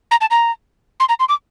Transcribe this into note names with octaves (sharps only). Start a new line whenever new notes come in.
A#5
A5
A#5
C6
A#5
C6
D6